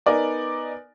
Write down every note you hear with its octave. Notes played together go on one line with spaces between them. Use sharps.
B3 D#4 A#4 D5 G#5